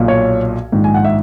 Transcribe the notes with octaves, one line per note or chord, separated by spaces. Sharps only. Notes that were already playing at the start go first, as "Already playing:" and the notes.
Already playing: B1 A#2
C#5
A#1 G#2 D#3
G#5
F#5
E5